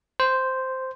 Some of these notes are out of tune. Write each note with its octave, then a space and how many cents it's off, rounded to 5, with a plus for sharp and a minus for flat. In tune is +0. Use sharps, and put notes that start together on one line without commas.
C5 -5